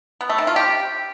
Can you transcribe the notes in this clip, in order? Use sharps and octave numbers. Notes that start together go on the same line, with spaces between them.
B3
A3
D#3
F4
G4